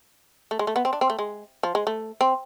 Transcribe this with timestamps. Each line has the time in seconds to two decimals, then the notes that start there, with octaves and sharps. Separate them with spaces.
0.51 A3
0.59 G#3
0.67 A3
0.76 B3
0.85 C4
0.93 D4
1.01 C4
1.10 A3
1.19 G#3
1.63 F3
1.75 G#3
1.87 A3
2.21 C4